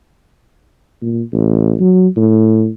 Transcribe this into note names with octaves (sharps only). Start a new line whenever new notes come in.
A#2
A1
F#3
A2